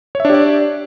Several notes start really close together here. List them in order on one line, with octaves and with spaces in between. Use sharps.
C#5 E5 D4 G4 D5